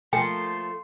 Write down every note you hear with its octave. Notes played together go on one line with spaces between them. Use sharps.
F3 A3 A#3 G5 C6